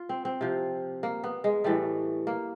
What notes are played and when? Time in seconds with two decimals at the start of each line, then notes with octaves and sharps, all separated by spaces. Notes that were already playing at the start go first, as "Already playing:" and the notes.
Already playing: F4
0.09 C4
0.25 C4
0.41 C3 F3
1.03 A#3
1.24 B3
1.44 G#3
1.64 A2 E3 G3 A3
2.27 A#3